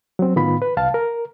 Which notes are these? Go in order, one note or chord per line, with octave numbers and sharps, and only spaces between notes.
F#3 C4
A2 D#3 B3 F4 B5
B4
C2 F5 A5
A#4